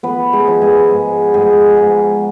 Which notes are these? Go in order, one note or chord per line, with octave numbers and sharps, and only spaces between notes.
F3 B3 B4
G#3 G#4
F3
G#3 G#4
G#2
G#2 G#3 G#4
G#2